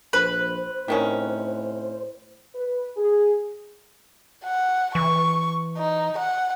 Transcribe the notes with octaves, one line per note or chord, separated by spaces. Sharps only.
A#1 B4 C5
A2 C3 D#3 C#4
B4
G#4
F#5
E3 C#6
D#4
F#5